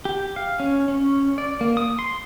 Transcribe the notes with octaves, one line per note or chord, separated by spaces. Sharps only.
G4
F5
C#4
C#4
D5
A#3
D#6
C6